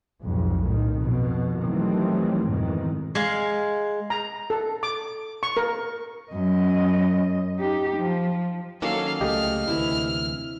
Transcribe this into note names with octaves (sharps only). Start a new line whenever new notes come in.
B1 F2 G#2
A2 D#3
F2 B2
D#3 E3 F#3 G3 A3 C4
F2 G#2 B2 D#3 E3
G#3 F5
A#5
A4
D6
C#6
A#4
F#2 D#5
D#4 G4
F3
D#3 F#3 A#3 C#4 A4 F5
C#2 G3 A3 G4 D#5 F6
D2 C3 E3 E4